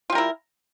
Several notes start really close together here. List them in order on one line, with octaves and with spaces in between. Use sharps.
F4 G3 A#4 E4